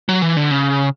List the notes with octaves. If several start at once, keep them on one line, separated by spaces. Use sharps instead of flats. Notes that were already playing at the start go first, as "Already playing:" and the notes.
F#3
E3
D3
C#3